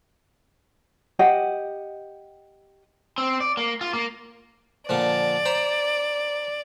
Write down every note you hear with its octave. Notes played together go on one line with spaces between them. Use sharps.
G4 D#5 F#5
C4
D5
A#3
F4
A#3
A#2 D3 F3 D5
C5 A#5 B5